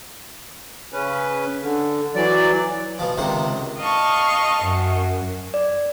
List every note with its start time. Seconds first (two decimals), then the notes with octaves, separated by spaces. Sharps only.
0.92 C#3 C#4 B4
1.62 D3
2.15 E3 F#3 D5
2.99 B2 F3
3.17 C#2 C3 D#3 C5
3.79 D#5 F5 A5 C#6
4.63 F#2
5.54 D5